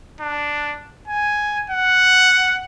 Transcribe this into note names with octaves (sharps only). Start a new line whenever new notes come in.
D4
G#5
F#5